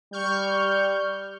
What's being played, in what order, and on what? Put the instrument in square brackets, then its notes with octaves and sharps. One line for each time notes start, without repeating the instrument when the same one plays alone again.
[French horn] G3 [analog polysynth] C#6 F6 G6